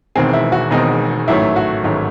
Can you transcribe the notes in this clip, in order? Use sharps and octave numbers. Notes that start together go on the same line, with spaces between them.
E1 E2 D#3 G#3 C4 G#4
E4
F#4
E1 E2 D#3 G#3 C4 D#4
A1 G#2 D#3 F#3 A3 E4
F#4
A1 G#2 D#3 F#3 A3